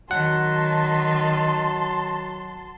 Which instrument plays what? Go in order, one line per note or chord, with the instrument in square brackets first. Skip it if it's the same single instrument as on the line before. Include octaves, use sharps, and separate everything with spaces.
[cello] D#3 [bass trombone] F#3 [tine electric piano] F#5 [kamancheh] A5 C6